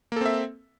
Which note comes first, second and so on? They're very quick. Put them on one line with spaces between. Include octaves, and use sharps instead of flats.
A#3 A4 C4 E5